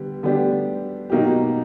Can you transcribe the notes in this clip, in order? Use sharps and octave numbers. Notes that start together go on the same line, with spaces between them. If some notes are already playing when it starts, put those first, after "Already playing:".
Already playing: D3 G3 B3
D3 G3 B3 D4 G4
B2 F#3 A#3 D#4 G4